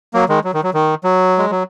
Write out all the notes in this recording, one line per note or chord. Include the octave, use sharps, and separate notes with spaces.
F#3 A#3
D#3 G#3
F#3
D#3
F#3
D#3
F#3
G#3
F#3